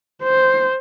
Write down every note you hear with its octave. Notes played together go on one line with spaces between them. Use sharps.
C5